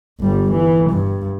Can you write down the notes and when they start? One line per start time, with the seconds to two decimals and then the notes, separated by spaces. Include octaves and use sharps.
0.21 G1 G3
0.51 E3
0.90 G2